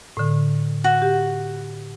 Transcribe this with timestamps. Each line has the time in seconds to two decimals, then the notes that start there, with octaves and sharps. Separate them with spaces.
0.17 A2 D3
0.84 F#4
1.02 G4